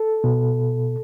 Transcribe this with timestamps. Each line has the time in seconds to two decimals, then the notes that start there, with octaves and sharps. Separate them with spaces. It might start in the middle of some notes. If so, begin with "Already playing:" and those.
Already playing: A4
0.24 B2